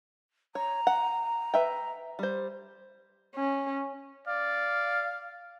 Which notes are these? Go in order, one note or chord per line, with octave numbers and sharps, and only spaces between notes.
C#5 A#5
F#5
B4 E5 G5
G3 C5
C#4
D5 F5